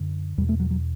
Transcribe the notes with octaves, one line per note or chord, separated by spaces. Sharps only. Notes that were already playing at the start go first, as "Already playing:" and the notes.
Already playing: F#2 D3
E2 B2 G3
A3
F#3
F#3